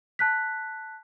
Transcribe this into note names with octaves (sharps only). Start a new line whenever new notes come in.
A5 F#6 B6